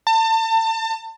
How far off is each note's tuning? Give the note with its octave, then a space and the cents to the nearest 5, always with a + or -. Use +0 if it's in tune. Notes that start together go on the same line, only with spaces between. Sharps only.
A5 +35